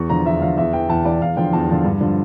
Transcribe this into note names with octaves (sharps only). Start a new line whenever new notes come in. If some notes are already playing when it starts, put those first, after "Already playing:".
Already playing: E2 C#6
D3 F3 A#5
E2 E5
D3 F3 F5
E2 E5
E3 G5
E2 A5
E3 D5
E2 F5
D3 F3 G5
E2 A5
D3 F3
G2
D3 F3